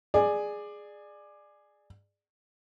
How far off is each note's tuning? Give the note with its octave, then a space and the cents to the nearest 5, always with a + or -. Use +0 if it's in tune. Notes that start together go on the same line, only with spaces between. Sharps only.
G#4 +0 D5 +20